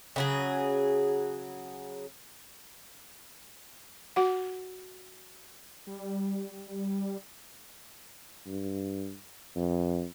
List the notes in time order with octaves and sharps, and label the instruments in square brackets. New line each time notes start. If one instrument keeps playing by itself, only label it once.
[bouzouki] C#3 F#3 G#4
[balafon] F#4 F#5
[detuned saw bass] G3
[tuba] G2
F2